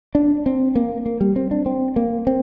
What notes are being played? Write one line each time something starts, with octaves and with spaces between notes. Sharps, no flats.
D4
C4
A#3
A#3
G3
C4
D4
C4
A#3
C4